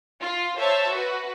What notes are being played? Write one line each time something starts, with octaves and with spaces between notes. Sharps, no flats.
F4
C5 C#5 E5 A5
F#4 B4